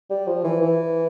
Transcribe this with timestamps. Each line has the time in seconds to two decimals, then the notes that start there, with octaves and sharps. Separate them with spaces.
0.10 G3
0.27 F3
0.44 E3
0.62 E3